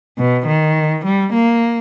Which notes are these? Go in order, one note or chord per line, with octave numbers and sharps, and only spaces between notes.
B2
D#3
G3
A#3